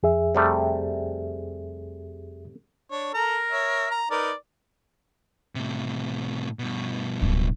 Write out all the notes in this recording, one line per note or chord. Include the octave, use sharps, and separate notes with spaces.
F2 G#4 E5
C3 G3 A3
D4 C#5
A4 A#4 A#5
C#5 E5
A#5
D#4 A#4 B4 D5
A2 C3
G2 B2
D1 C#2